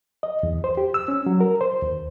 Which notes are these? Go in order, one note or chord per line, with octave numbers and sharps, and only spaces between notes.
D#5
E2
C5
G4
E6
C#4
F#3
A#4
C5
D#2